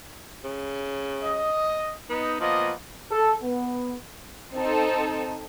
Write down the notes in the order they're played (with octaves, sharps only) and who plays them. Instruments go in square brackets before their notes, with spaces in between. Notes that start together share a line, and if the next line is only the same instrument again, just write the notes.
[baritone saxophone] C#3
[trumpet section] D#5
[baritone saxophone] B3 [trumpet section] D#4
[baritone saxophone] F3 [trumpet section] A#3 B3 D#5
[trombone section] A4
B3
[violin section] C4 D#4 A4